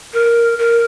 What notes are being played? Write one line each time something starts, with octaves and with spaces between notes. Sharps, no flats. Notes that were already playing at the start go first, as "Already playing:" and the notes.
A#4
A#4